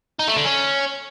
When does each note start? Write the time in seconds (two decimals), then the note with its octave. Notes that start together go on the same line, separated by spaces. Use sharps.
0.19 D#4
0.28 A3
0.36 D3
0.45 C#4